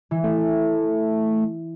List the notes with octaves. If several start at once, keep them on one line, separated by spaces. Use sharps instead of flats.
E3
A3